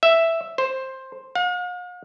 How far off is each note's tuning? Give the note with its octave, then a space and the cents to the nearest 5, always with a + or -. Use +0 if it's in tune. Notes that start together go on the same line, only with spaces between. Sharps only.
E5 +0
C5 +10
F5 +45